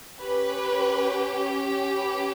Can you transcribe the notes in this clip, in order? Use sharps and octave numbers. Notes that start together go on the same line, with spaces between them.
C#4 G4 B4
B4